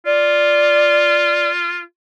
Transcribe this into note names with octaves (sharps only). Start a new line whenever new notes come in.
F4 D5